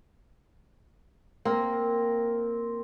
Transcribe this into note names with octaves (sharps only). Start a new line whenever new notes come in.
A#3 C4 A#4